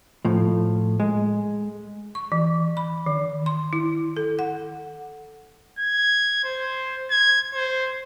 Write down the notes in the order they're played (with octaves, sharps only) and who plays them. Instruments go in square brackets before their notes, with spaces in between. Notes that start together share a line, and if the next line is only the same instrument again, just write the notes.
[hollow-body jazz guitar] A2 F3
G#3
[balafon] C#6
E3
B5
D#3
C6
E4
A4
F#5
[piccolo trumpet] G#6
C5
G#6
C5